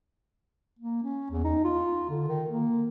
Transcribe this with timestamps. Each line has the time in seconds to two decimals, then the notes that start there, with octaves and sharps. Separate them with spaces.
0.79 A#3
1.03 C#4
1.31 E2
1.44 D#4
1.64 F4
2.10 D3
2.28 D#3
2.49 A#3